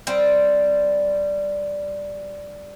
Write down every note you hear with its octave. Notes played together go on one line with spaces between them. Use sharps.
G3 C4